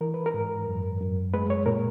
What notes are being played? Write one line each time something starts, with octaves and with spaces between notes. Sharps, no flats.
E3 A#4
B4
A#4
G#2
F#2
F#2
G#3 B4
C#5
A#2 A#4